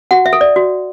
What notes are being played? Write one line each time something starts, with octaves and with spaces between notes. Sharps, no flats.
F#4 F#5
E5
A4
D5
F#4